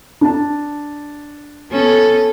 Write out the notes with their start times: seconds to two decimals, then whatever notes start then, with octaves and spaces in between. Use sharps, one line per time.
0.21 D4 A5
1.71 B3 C#4 A4